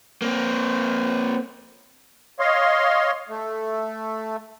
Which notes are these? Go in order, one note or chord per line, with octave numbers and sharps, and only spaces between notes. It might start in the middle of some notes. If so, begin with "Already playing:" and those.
A#3 C4
C#5 D#5 F5 C6
A3